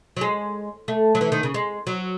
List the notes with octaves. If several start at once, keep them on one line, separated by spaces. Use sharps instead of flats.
F#3
G#3
A3
F#3
E3
D#3
C#3
G#3
F#3